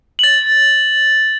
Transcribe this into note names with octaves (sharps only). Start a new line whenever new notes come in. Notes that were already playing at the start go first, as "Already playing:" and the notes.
A6 F#7